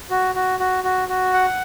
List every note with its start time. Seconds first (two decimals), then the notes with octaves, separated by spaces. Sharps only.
0.10 F#4
0.35 F#4
0.60 F#4
0.84 F#4
1.09 F#4
1.33 F#5